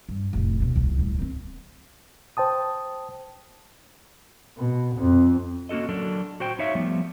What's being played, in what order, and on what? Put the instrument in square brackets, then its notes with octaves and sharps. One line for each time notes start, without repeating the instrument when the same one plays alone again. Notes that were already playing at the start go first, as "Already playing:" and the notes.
[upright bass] G2
F1 A2
D#2 B2
D#1 C2
D1 G3
D#3 C4
[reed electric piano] C5 G5 A5 D#6
[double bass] B2
F2
[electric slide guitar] A#3 C#4 F#4 A4 D#5
F#3 D4 A4 A#4
F#4 C5 G5
D#4 C#5 E5 F5
F3 G3 A3 B3